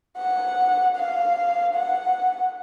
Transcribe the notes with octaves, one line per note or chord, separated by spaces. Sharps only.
F#5
F5
F#5